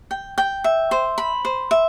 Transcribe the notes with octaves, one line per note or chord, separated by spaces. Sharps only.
G5
G5
E5
C5
B5
C5
E5